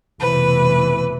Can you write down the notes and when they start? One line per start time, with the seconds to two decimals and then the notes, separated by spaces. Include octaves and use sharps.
0.19 F1 B2 E3 B4